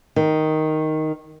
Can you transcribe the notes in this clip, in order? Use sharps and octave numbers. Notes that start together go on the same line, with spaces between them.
D#3